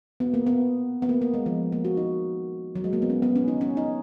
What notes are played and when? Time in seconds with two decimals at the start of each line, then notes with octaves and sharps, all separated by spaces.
0.20 B3
0.34 A#3
0.47 B3
1.02 B3
1.09 A#3
1.22 A#3
1.34 G#3
1.46 F3
1.72 A#3
1.85 F#4
1.97 D#4
2.75 F#3
2.84 G#3
2.93 A#3
3.02 B3
3.10 C#4
3.22 B3
3.36 C#4
3.48 D#4
3.61 C#4
3.77 D#4